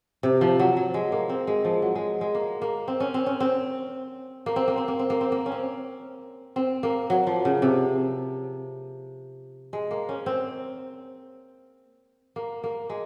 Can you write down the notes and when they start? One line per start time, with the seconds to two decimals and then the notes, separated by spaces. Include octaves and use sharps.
0.23 C3
0.41 F3
0.59 F#3
0.77 F#3
0.94 G#3
1.12 A#3
1.29 C4
1.47 G#3
1.65 F3
1.82 F#3
1.95 G#3
2.21 G#3
2.35 A#3
2.62 A#3
2.88 C4
3.00 C#4
3.14 C4
3.26 C#4
3.40 C4
4.46 A#3
4.56 C4
4.68 A#3
4.77 C4
4.88 A#3
4.99 C4
5.10 A#3
5.21 C4
5.32 A#3
5.46 C#4
5.52 C4
6.56 C4
6.83 A#3
7.10 F#3
7.27 F3
7.45 C#3
7.62 C3
9.73 G#3
9.91 A#3
10.09 C#4
10.26 C4
12.36 A#3
12.64 A#3
12.90 G#3